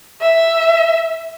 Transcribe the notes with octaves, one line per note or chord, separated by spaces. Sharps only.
E5